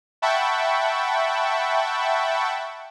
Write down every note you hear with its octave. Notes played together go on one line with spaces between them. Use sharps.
E5 F#5 G5 A5 B5 C#6